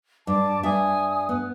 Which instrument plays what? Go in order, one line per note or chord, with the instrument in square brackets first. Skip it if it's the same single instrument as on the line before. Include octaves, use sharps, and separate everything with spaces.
[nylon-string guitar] G2 [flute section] A5 D6
[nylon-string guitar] G2 E5 [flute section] G#5 D#6
[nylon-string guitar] B3